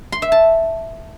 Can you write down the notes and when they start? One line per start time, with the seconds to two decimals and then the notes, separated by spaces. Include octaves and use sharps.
0.12 C6
0.22 E5
0.32 A5